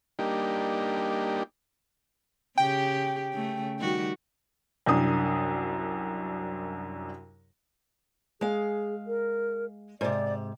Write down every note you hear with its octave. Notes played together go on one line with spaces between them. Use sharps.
G3 A#3 D4 D#4 G4
C#3 G4 G5
C#3 A3
D#3 G3 F#4
C2 F#2 D4 D#6
G#3 G#4 F5
A#4
G#2 C3 D5